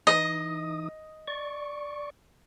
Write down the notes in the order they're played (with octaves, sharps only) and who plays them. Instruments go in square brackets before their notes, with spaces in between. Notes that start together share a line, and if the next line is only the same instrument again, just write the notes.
[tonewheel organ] E3 D#4 D#6 [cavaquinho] D#5
[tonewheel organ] D5 C#6